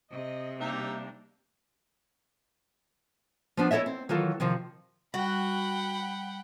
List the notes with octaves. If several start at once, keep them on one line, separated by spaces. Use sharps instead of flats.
C3 D#5
G3 A#3 D4 D#4 G4 E5
F3 B3 D4
E4 A4 C#5 D#5 E5
C4
D#3 E3 F#3 F4 A4
C3 D#3 F3
G3 F#4 F#5 G5 B5